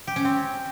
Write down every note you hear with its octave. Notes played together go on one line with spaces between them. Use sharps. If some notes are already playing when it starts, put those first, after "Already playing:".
G4
C#4
C4